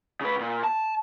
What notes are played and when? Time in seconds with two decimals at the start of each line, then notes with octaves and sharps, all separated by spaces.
0.21 C#3 B4
0.40 A#2
0.64 A5